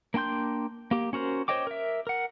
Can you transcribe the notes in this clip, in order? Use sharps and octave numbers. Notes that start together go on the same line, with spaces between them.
A#3 D4 G5 C6 G6
A#3 G4
C#4 F#4 A#4 C5
C5 C#5 D#5 G5 D6
A#4 E5
A#4 F#5